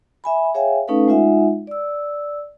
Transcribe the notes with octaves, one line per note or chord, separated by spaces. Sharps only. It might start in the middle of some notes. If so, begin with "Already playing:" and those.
E5 G#5 B5
G#4 C#5 E5 F5 G5 G#5
A3 C#4 D#4 A4 B4 F5
G#3 D#4 F4 E5 F#5 G#5
D5 E6